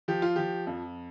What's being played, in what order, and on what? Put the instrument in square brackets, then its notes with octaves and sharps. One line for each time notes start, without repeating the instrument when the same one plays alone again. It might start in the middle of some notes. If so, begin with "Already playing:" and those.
[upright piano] F3 G4
F4
F3 G4
F2